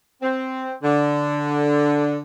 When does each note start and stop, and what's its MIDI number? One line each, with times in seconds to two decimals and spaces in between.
0.22 0.73 60
0.83 2.17 50